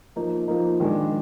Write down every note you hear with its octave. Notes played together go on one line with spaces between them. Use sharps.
F3 A#3 D#4
F3 A#3 D#4
D#3 G#3 D4